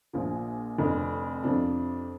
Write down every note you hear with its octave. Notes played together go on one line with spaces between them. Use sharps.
A#1 A#2 F3
F1 F2 D3
F2 C3 F3 D4